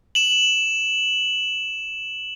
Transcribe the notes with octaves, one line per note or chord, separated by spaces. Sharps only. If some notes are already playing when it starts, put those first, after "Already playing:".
E7 F#7